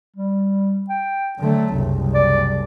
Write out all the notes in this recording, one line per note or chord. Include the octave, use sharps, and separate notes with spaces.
G3
G5
D3 F#3 A3
F#1 C2
D5